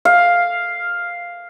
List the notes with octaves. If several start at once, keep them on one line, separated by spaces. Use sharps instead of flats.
F5